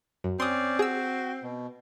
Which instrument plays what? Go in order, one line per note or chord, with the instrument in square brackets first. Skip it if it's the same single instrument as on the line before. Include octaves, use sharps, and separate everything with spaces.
[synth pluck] F#2
[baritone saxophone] C4 [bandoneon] C#4 D5 [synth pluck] C6 D#6
[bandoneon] F#4 [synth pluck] G#4 E6
[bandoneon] B2